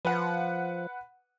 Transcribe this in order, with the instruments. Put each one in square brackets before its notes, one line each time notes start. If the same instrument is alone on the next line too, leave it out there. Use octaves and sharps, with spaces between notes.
[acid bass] F3 [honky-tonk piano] B4 F#5